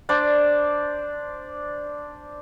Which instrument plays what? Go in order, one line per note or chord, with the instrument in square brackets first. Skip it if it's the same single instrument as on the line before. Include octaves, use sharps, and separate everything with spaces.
[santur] D4 C5 D5